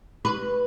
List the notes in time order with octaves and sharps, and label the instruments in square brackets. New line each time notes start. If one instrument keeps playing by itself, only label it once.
[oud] B4